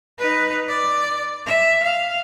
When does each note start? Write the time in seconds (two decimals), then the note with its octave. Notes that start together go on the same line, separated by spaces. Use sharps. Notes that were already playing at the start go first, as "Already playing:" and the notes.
0.19 D#4 B4
0.68 D5
1.47 E5
1.83 F5